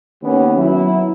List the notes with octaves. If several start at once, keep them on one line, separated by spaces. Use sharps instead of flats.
D#2 B3 C#4
F#3 E4